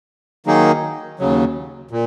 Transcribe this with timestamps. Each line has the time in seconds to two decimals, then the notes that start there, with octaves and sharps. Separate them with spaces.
0.46 D#3 F#3 A#3 D#4 G#4
1.19 D#2 C#3 F#3
1.91 A#2